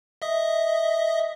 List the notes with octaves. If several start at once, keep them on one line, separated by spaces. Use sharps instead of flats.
D#5 E5 D#6